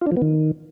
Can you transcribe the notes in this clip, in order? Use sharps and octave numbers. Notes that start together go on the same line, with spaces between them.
F4
D4
F3
B3
D#3